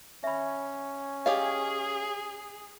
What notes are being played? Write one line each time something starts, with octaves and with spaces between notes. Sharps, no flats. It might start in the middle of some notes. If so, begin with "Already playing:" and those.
C#4 E5 B5
G4 G#4 C#5 D#5 F5